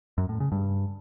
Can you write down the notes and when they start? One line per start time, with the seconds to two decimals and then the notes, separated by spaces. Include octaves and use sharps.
0.18 F#2
0.29 A2
0.40 C#3
0.52 G2